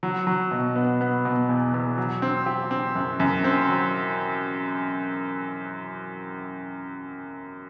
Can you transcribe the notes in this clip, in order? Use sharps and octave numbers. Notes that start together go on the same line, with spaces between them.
F#3
F#3
B2
B3
B3
B2
E2
E2
F#3
C4
G4
C4
F#2
F#2
C4
F#3